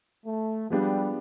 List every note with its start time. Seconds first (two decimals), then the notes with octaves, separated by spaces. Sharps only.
0.26 A3
0.70 F3 G3 G#3 B3 D4 G4